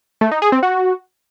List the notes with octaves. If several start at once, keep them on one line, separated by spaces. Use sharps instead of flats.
A3
D#4
G#4
C4
F#4